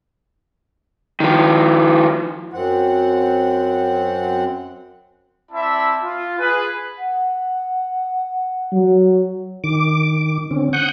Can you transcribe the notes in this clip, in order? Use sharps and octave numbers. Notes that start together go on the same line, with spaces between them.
D#3 F3
F#2 C4 F#5
C4 E4 D5 E5 A5 B5
F4
G#4 B4
F#5
F#3
D#3 D6
D3 C4 C#4
F#5 C#6 D#6 F#6 G6